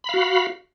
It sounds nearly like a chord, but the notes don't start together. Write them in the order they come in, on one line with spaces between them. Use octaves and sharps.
B5 F5 F#4